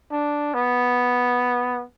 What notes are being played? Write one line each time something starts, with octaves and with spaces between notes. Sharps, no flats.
D4
B3